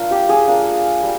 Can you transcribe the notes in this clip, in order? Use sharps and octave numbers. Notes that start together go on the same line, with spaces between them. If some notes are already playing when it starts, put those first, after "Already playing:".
Already playing: A#3 D4 F4
G4
G#4
A#3 D4 F4
G3